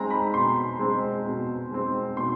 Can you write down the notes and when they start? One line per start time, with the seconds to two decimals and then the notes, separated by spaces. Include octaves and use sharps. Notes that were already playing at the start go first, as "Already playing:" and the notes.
Already playing: G#3 C4 G#5 A#5
0.10 B5
0.34 B2 C6
0.79 G#3 C4
1.25 B2
1.71 G#3 C4
2.16 B2 C6